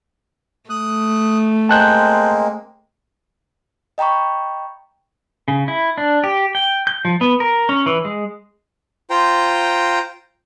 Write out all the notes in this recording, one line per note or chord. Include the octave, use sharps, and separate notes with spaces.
A3 D#6 F#6
G#3 A#3 C4 A5 F#6 G6
D#5 G5 A#5 B5 C#6
C#3
E4
D4
G4
G5
G6
F3
B3
A#4
C#4
E3
G#3
F4 C5 G5 A#5